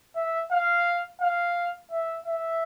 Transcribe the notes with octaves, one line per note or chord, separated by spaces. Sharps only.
E5
F5
F5
E5
E5